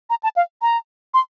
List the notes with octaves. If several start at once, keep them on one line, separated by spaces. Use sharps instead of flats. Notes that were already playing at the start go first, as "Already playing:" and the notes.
A#5
A5
F5
A#5
C6